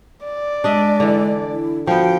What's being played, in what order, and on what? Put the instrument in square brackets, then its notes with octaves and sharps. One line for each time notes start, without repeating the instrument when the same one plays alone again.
[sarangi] D5
[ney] G#3 [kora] D4 D#5 E5
[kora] D3 E3
[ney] E4
[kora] F3 B3 [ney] F#4 [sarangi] G5